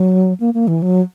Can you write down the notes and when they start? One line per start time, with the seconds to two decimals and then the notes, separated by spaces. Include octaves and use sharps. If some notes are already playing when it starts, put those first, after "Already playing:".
Already playing: F#3
0.40 A#3
0.54 A#3
0.68 E3
0.82 F#3